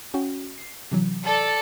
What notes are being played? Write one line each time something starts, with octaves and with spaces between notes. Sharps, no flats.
C#4 F#4 G5
C7
C3 E3 F#3
A4 D5